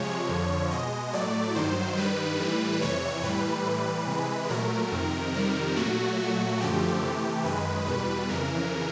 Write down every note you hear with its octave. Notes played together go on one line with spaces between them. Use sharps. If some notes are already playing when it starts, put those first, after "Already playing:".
Already playing: C3 F3 G#3 C#5
F2 D3 F3
B2 G#3 D#5
A2 F#3 A3 D5
G2 D#3 F#3 C5
G2 D#3 G3 B4
A2 E3 G3
F2 C3 E3 C#5
A2 E3 G3 B4
A2 E3 G3
C3 E3 G#3
A#2 F#3 A3 A#4
F2 C3 D#3
F2 C3 D#3 G3 A#4
A#2 F#3 A3 F#4
A#2 F#3 A3
F#2 D3 F3 A3 G4
C3 E3 A3
F#2 D#3 G#3 B4
E2 B2 G3 B4
F2 C#3 E3 A#4